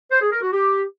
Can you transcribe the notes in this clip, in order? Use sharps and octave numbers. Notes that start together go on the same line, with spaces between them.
C5
G#4
A#4
F#4
G4